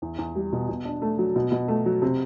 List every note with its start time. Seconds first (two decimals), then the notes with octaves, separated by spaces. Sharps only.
0.02 E2
0.18 E2
0.35 G3
0.53 B2
0.69 B2
0.85 D4
1.02 A3
1.18 F#3
1.36 B2
1.52 B2
1.68 A3
1.86 F#3
2.02 C3